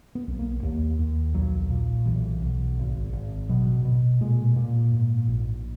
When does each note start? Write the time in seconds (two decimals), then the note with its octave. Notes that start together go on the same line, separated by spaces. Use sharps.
0.15 B3
0.28 B1
0.39 A#3
0.63 D#2 A#3
0.99 D#2
1.34 B1 F#3
1.70 A#2
2.05 B1 E3
2.42 B1
2.77 G#1
3.13 G#1
3.49 B2 F#3
3.85 B2
4.21 A#2 G#3
4.56 A#2
4.91 G#2
5.27 A#1